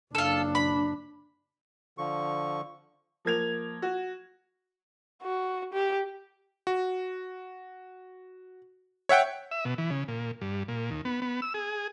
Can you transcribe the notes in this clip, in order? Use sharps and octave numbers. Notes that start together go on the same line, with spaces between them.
F#1 D4 F4 A4
B5
D3 F3 C#6
F3 A#3 G#6 F7
F#4
F#4
G4
F#4
C#5 E5 F#5 G5
E5
B2
E3
C#3
A#2
G2
A#2
D#2
B3
B3
E6
G#4